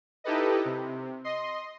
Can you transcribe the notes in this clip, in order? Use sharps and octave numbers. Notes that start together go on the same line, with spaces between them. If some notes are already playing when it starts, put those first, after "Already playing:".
D#4 E4 G4 A4 B4 D#5
C3
D#5 C6